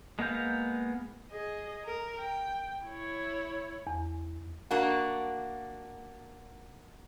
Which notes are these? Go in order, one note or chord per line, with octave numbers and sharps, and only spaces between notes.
G#3 A#3 B3 F5 G6
G#4 D#5
A#4
G5
E4 C#5
E2
A#3 D4 F#4